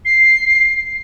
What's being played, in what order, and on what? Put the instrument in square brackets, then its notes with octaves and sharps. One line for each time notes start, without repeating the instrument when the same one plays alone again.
[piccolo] C7